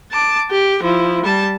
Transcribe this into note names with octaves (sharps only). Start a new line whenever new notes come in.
A5 D6
G4
F3 E4
G3 A5